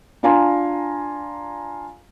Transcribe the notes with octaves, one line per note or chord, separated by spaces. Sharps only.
D4 F4 F5 G#5 A#5 C6